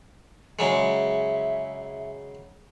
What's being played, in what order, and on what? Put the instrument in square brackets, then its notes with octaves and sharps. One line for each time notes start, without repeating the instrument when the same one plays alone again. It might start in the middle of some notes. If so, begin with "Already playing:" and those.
[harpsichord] C#3 F#3 G#3 [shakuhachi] E5